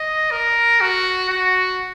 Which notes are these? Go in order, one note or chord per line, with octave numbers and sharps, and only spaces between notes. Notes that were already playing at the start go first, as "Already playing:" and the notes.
Already playing: D#5
A#4
F#4
F#4